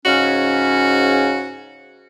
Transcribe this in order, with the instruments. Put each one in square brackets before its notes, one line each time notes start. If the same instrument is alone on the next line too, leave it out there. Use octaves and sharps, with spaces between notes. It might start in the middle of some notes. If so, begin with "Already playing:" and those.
[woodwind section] G#2 C#3 C#4 [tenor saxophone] F#4